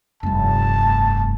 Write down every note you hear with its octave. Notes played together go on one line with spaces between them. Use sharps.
F1 G2 A5